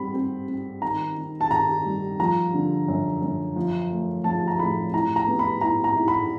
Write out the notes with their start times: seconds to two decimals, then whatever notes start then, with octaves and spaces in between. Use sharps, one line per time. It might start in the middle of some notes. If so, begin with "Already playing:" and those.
Already playing: G3 C4 B5
0.14 C4
0.48 C4
0.82 D#3 A#5
1.17 D#3
1.41 A5
1.51 D#3 A#5
1.85 G3
2.20 F3 A#5
2.54 D3
2.88 F#2
3.22 F#2
3.56 F3
3.91 A3
4.24 F3 A5
4.48 A#5
4.59 A2 B5
4.94 E4 A#5
5.16 A#5
5.27 B3
5.39 B5
5.61 E4 A#5
5.84 A#5
5.96 E4
6.08 B5